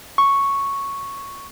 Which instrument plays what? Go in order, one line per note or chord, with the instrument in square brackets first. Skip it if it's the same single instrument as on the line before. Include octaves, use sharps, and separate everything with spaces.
[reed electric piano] C#6